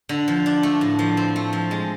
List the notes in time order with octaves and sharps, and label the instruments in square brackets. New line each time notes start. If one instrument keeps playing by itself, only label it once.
[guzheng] D3
F3
D4
A3
A2
F3
C4
A3
F3
G#3